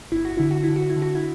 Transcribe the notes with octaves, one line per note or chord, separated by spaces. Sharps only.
G1 E4
F#4
D3 E4
F#4
D3 E4
F#4
E4
D3
F#4
E4